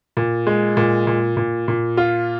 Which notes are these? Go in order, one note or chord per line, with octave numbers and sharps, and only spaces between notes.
A#2
G#3
A#2
A#2
A#2
A#2
F4